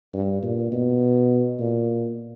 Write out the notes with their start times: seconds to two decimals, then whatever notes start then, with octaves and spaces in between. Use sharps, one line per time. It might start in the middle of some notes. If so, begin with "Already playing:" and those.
0.14 G2
0.43 A#2
0.72 B2
1.59 A#2